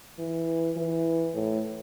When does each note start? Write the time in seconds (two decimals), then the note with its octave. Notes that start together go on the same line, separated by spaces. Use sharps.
0.19 E3
0.76 E3
1.34 A2